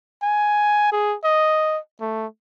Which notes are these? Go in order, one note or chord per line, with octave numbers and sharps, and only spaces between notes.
G#5
G#4
D#5
A3